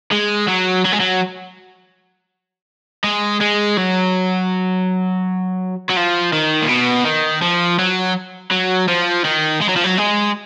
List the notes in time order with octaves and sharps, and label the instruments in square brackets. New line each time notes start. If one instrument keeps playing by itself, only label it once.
[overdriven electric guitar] G#3
F#3
F#3
G#3
F#3
G#3
G#3
F#3
F#3
F3
D#3
A#2
B2
D#3
F3
F#3
F#3
F3
D#3
G#3
F#3
F3
F#3
G#3